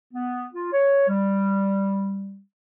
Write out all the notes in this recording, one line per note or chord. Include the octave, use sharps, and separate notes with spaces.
B3
F4
C#5
G3